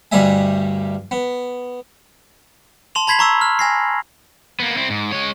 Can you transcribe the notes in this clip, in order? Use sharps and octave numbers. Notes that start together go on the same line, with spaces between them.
D2 G2 G3 D#5 E5 G#5
B3
A5 C6 F7
A5 B5 G#6 B6 C7 F#7
A#5 C#6 E6
F6
G#5 A#6 C7
A#3 B3
C4 E4
G#2
G#3 C#5